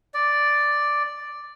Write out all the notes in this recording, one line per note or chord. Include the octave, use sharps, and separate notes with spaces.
D5